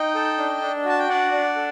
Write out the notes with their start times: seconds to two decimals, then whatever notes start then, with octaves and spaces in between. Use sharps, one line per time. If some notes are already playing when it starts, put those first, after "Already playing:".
Already playing: D#4 D#5 G5
0.15 A4
0.38 D4
0.61 D4
0.85 F#4 A5
0.99 G5
1.09 D4 D5 F#5
1.32 D4
1.56 A4